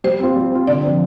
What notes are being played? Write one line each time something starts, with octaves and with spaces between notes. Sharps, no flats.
G3 C5
C4 F4
G3
C4 F4
D3 D5
F3 C4